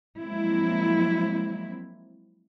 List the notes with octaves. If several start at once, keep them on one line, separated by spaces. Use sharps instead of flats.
F3 F#3 G#3 A#3 C4 E4